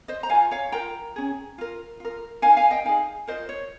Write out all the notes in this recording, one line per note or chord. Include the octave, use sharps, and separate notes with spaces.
C5 D#5
A#5
F4 A#4 F5 G#5
C#5 F5
F4 A#4 G5 A#5
C#4 G#4
F4 A#4
F4 A#4
D#4 A#4 F5 G#5
F5 G#5
D#5 G5
D#4 G#4 F5 G#5
F4 A#4 C5 D#5
C#5